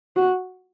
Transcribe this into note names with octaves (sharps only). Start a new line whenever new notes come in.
F#4